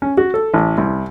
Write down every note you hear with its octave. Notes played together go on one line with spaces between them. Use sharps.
C#4
F#4
A4
A1
C2